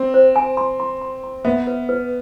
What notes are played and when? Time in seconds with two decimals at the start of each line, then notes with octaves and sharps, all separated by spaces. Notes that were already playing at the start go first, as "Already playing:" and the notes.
Already playing: C4
0.14 C5
0.36 G#5
0.57 C6
0.80 C6
1.01 C6
1.24 C6
1.45 B3 E5
1.67 B4
1.89 B4